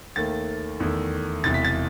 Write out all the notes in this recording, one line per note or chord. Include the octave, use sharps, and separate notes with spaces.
D#2 D#3 A3 A6
E2 D#3 A3 E4
E1 E2 C3 A6
B6
A6